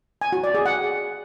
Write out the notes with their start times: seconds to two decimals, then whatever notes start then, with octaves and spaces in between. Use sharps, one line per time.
0.21 G#5
0.33 F#4
0.44 D5
0.55 G#4
0.66 F#5